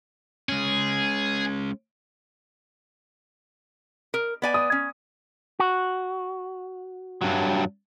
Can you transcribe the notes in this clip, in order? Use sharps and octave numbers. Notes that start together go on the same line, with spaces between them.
G#3 C#4 G#4
A#4
B3 D5 G#5
D#6
C#4
F#4
G2 F#3